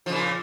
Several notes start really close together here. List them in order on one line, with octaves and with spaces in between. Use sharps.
F3 C#3 A#2